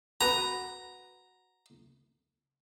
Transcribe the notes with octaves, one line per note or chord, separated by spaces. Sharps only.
F#4 B4 A#5